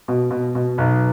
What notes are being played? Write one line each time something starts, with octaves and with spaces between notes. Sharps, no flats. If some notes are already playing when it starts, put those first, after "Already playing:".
B2
B2
B2
B1